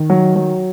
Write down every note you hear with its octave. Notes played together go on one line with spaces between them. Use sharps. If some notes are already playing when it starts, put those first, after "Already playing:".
Already playing: D#3
F#3
F#3